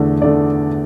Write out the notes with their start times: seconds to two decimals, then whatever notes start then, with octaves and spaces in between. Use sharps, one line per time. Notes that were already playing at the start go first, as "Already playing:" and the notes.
Already playing: E2 D3 A3
0.22 D3 A3 D5